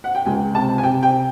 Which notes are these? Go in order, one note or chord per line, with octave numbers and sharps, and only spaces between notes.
F#5
G5
C#2 G#5
C3 A5
G#5
C3 G5
G5